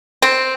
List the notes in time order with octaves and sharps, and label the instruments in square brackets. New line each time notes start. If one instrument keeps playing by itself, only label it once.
[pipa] C4